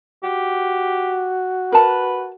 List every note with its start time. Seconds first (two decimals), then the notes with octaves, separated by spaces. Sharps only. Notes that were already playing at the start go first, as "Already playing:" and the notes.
0.24 F#4 G4
1.72 A#4 B4 A5